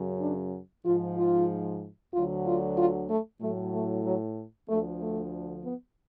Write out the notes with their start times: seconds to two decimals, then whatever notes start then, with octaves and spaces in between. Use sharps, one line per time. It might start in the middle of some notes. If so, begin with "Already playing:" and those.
Already playing: F#2 C#3 F#3
0.21 D4
0.85 G#2 F3 F4
1.17 F4
2.13 D2 D3 F#3 F4
2.46 F4
2.77 F4
3.09 A3
3.41 A2 F#3 A3
3.74 A3
4.05 F#3
4.69 D2 D3 F3 A3
5.01 A3
5.65 B3